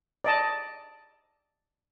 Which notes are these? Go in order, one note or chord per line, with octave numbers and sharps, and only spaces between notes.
D5 D#5 A5